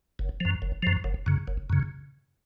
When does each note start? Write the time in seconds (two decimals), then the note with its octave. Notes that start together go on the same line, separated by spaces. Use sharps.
0.19 F#1
0.40 F#2 F3
0.62 F#1
0.83 F#2 F3
1.04 F#1
1.26 F#2 C#3
1.47 F#1
1.70 F#2 C#3